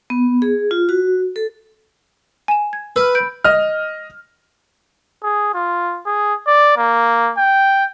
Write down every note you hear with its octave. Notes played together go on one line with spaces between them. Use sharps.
B3
G#4
F4
F#4
A4
G#5 E7
G#6
B4 E6 F6
B5 G6 D7
D#5 F6
G#4
F4
G#4
D5
A#3
G5